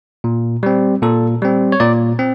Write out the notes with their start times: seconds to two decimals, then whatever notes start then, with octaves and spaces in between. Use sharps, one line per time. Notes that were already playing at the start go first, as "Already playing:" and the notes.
0.24 A#2
0.63 G3 C4
1.02 A#2 A4
1.42 G3 C4
1.72 C#5
1.80 A#2 D5
2.19 C4